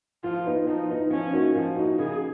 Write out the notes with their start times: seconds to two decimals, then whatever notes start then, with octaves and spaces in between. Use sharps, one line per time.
0.23 F3 F4
0.46 B3 D#4
0.67 F3 D#4
0.90 B3 D#4
1.11 F3 C#4
1.33 A#3 D#4 F#4
1.55 F3
1.77 A#3 D#4 F#4
1.99 C#3 G#4